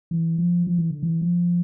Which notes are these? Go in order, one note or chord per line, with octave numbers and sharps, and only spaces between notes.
E3
F3
F3
E3
D3
E3
F3